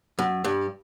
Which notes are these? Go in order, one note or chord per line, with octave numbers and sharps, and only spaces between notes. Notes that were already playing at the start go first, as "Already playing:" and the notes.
F#2
G2